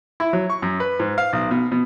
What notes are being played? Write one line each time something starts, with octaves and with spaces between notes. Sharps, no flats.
E4
F#3
C#6
F#2
B4
G#2
F5
B1
B2
B2